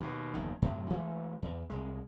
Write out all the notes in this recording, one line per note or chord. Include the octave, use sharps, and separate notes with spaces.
D#2 B2
F#1 E2 G2 D#3
F#2 A2 C3 F#3
E3 G#3 A3
E2
C2 G#3